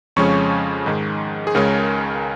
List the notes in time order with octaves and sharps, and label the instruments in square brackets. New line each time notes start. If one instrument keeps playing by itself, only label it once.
[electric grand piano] F2 C#3 F3 G#3 C#4 C#6
G#2 D#3 G#3
G#4
C#2 C#3 G#3 C#4 A#4